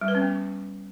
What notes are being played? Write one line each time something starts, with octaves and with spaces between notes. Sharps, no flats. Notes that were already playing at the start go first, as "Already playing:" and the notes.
G3
B4
C#4
B3